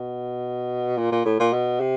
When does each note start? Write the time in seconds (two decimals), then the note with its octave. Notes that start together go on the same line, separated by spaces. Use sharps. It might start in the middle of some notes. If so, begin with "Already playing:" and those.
Already playing: B2
0.97 A#2
1.12 A#2
1.25 A2
1.40 A#2
1.53 B2
1.80 C3